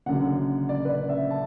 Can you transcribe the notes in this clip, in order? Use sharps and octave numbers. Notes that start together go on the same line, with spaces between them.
F#1 F#2 D3 F#5
D5
B4
D5
E5
A5